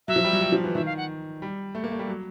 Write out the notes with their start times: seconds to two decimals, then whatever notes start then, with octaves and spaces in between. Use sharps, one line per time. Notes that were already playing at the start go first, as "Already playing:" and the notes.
0.08 F#3 E5
0.16 F3
0.24 G3
0.33 F#3
0.41 G3
0.52 F3
0.64 E3
0.74 D#3 E5
0.86 F5
0.97 F#5
1.42 G3
1.75 A3
1.84 A#3
1.92 A3
1.99 G3
2.08 F#3